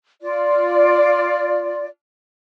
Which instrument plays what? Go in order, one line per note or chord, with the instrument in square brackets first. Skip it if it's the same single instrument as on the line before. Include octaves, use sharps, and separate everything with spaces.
[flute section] F4 D5